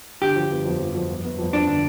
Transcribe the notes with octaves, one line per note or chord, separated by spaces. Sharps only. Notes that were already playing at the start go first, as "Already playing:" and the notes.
D3 G4
F3
G1
F2
F3
F2
G1
G1
F2
F2 D4
D3